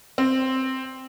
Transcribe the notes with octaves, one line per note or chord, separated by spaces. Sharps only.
C4